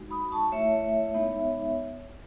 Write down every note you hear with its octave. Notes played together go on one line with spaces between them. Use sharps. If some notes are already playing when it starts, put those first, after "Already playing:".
Already playing: G#3 D#4 F#4
B5 D#6
A5 C#6
A3 E4 C#5 E5
G#3 B3 D#4